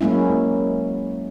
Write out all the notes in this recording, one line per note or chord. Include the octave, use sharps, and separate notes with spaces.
F#3 G#3 A#3 C#4 E4